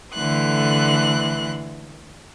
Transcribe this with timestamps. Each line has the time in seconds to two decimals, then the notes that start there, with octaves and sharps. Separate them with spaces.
0.14 D3 E3 A3 C6 F#6